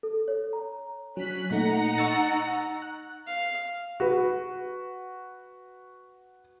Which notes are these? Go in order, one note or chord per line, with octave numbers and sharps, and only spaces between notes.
A4
C#5
A#5
F#3 C#4 F#6 B6
A#2 A3 D#4 F#5 A#5
C#6 E6 A6
F#6
F5
F#4 B4